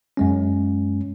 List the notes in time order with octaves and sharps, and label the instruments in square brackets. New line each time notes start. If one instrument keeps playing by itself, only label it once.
[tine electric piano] F#2 G#3 C#4